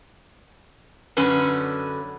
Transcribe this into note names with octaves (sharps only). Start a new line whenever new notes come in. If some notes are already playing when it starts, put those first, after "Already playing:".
F#2 D3 C#4 B4